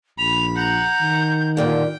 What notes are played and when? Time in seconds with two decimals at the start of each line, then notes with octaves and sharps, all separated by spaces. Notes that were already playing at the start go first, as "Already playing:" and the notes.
0.19 A#1 B5 F7
0.56 F#5 A#5 G6
1.01 D#3
1.57 G2 A#2 D3 G5